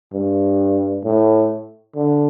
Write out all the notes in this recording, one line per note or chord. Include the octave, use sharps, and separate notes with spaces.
G2
A2
D3